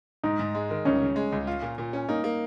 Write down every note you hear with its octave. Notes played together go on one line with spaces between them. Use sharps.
G#2 D#4
G#2
G#3
D#3
C#2 C#4
C#3
G#3
C#2
F4
A#2
A#2
C#4
A#3 D#4
A#3